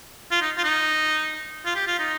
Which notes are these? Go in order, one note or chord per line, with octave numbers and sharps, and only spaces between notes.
F4
D#4
F4
D#4
F4
G4
F4
D#4